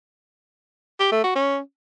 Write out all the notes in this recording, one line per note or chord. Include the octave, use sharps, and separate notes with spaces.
G4
A3
F#4
C#4